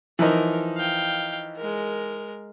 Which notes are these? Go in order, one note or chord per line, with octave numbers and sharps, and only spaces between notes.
E3 F3 D#4 A#4
F5 G5
G#3 A#4